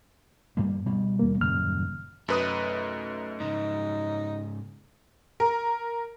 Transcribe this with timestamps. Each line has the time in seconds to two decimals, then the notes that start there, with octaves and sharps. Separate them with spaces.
0.57 G2 G3 A#3
0.86 B2 G3
1.19 D#2 A#3
1.41 D#1 F#2 C#3 F6
2.28 F#2 A3 D#4 B4 D#6
3.40 G#2 C#3 D#4
5.40 A#4